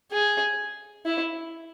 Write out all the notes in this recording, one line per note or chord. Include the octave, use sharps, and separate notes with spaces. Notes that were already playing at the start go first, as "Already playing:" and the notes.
G#4
E4